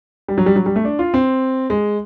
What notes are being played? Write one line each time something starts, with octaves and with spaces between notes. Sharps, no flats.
G3
F#3
G3
F#3
G3
A3
D4
F4
C4
G#3